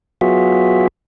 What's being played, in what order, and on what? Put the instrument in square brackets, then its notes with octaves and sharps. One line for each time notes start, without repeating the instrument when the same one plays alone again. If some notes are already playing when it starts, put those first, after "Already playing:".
[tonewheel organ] F#3 B3 F4 F#4 G#4 E5